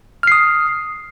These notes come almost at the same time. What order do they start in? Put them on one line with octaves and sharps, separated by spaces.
F6 C7 D#6